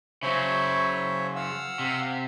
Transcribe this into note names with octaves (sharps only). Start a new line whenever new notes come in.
C#3 F#3 C5 C#5 E5
F5 F#5 E6
C3